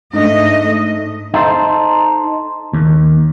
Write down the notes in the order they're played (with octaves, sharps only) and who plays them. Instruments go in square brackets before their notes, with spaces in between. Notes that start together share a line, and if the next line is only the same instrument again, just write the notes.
[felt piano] G#2 D4 [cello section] A3 D#5
[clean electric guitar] D#4 A4 C5
D#2